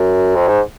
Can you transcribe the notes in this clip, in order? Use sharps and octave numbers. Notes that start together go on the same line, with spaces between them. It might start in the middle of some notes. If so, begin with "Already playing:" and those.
Already playing: F#2
F2
G#2